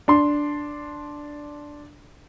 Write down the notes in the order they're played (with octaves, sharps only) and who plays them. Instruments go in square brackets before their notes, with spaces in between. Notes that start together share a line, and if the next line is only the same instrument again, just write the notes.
[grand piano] D4 C6